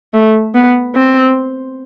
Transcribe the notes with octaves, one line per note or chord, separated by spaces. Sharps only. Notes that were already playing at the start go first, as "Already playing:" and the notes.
A3
B3
C4